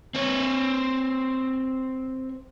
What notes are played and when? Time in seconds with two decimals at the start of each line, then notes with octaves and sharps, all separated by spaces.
0.15 C4 C#5